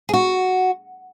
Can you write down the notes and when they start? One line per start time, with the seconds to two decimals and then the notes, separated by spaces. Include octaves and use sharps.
0.09 G#4
0.13 F#4